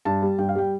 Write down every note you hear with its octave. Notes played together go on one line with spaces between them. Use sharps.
G2 A5
G3
G2 G5
F5
G3 G5